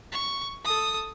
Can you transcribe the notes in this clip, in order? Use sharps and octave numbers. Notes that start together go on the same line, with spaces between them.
C#6
A4 D#6